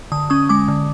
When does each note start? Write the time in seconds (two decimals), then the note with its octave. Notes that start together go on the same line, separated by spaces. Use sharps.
0.12 D3 D#6
0.30 C#4 D#6
0.49 G#3 D6
0.68 D3